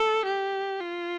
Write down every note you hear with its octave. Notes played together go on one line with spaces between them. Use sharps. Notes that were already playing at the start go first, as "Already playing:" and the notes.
Already playing: A4
G4
F4